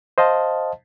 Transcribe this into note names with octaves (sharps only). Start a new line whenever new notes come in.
C5 D#5 F5 A5